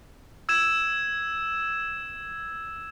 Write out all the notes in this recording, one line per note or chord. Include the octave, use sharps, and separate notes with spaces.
E6 G#6 E7